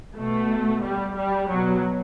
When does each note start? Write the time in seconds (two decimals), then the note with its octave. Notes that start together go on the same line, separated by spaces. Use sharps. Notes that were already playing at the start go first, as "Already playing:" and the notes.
0.17 B2 A3
0.84 G3
1.18 G3
1.50 B2 F#3